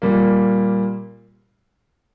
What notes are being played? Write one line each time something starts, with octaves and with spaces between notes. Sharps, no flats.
A#2 G3 A#3